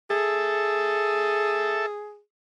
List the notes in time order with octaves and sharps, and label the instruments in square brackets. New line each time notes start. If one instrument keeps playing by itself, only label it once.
[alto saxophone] G#4 [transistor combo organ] A4 E5